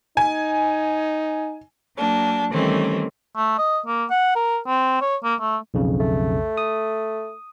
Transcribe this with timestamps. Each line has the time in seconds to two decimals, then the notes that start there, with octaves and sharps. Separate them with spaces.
0.17 D#4 G#5
1.97 F#3 A#3 D4
2.52 D#3 E3 G3 A3 C4 C#4
3.37 A3
3.58 D#5
3.86 A#3
4.10 F#5
4.36 A#4
4.67 C4
5.01 C#5
5.24 A#3
5.40 A3
5.74 B1 F2 C#3
6.00 A3
6.57 D#6